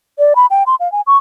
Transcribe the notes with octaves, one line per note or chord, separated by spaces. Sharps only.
D5
B5
G5
C6
F5
G#5
C#6